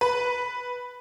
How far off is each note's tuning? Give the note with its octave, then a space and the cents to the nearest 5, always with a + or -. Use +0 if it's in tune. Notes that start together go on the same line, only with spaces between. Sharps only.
B4 -5